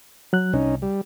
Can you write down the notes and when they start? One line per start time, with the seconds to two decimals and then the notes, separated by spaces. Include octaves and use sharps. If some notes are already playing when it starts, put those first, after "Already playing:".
0.33 F#3 F#6
0.53 C2 C#4 D#4
0.82 G3